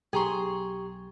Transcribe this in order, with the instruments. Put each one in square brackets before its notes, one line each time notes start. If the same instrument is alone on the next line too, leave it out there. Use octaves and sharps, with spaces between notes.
[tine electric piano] B1 [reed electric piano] G4 C#6 [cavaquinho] G#4 A#5 C6